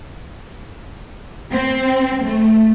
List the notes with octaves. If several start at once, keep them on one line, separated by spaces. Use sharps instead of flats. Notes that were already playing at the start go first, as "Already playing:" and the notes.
C4
A3